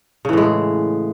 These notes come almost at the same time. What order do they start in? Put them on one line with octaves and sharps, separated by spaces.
C#3 E3 A2 G#3